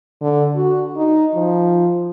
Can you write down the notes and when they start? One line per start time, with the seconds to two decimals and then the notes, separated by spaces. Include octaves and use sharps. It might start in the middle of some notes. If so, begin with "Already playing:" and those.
0.22 D3
0.56 F#4
0.96 D#4
1.35 F3